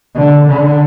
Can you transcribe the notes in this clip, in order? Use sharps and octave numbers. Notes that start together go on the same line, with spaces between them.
D3
D3